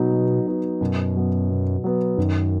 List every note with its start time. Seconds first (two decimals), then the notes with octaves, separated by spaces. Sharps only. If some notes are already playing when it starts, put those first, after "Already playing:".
Already playing: B2 F#3 B3 D#4 F#4
0.12 F#3
0.47 B3 D#4 F#4
0.81 F#2 B2
1.16 F#3 B3
1.50 B2
1.84 F#3 B3
2.18 F#2 D#3